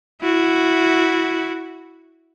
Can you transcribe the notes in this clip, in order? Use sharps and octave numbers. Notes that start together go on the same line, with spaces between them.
E4 F#4